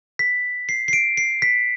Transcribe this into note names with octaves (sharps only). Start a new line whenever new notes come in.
B6
C7
C7
D7
C7
B6